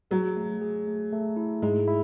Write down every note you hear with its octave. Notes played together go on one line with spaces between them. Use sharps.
F#3 G#4
A3
G#4
A3
A3
E4
G#2 G#3
E4